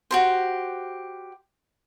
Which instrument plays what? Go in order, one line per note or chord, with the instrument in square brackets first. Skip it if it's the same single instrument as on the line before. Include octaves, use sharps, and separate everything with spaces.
[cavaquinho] F#4 G4 C5